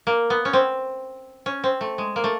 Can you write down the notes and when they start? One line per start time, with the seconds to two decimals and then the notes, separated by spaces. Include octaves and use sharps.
0.07 A#3
0.30 B3
0.45 C#4
0.53 C4
1.46 C#4
1.64 C4
1.81 A3
1.98 G#3
2.16 A#3
2.24 A3